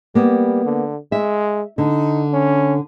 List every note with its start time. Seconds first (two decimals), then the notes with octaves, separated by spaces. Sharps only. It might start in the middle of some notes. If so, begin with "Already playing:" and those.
0.15 G3 A#3 B3
0.65 D3
1.12 G#3 E5
1.78 D3 D#4
2.33 C#4